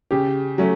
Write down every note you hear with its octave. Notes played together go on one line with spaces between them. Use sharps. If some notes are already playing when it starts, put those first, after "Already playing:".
C#3 G4
F#3 A3 C#4